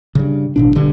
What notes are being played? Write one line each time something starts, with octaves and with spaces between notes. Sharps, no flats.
G2 C#3
A1 B2 D4
E1 G2 D3